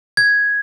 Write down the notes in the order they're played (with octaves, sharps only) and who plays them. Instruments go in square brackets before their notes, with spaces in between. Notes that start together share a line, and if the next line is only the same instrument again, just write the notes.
[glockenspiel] G#6